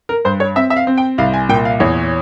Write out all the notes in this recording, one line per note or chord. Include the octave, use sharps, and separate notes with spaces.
A#4
G2 C5
C#5
C4 E5
E5
F5
C4
G5
C2 F5
G#5
A#2 G5
F5
E2 C#5